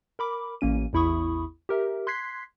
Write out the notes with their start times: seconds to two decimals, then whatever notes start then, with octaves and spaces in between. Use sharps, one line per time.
0.19 A#4 B5 D6
0.61 A1 A#3 C#4 D#7
0.93 A1 E2 E4 B5 C#6 D#6
1.69 G4 A#4 E5
2.07 C6 F#6 G#6 B6 C7